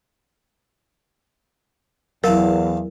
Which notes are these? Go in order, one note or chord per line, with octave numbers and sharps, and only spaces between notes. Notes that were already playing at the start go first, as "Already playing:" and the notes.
E2 F#3 E4 A#4 F5 A5